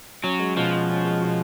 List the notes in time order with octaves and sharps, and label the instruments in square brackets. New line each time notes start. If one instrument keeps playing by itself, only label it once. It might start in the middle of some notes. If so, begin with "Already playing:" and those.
[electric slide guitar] F#3 [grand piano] C#4
[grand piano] G#3
[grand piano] B2 [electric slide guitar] F3
[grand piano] F#4
C#4
G#3
B2